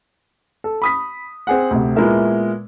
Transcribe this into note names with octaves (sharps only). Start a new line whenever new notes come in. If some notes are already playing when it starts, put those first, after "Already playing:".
A4
B5 D#6 B6
C4 G#4 F#5
D2 C3
A#2 G#3 B3 E4 A#4 E5